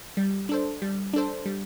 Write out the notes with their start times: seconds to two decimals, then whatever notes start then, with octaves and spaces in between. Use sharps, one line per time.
0.17 G3
0.49 D4 A4 C5
0.82 G3
1.14 D4 A4 C5
1.46 G3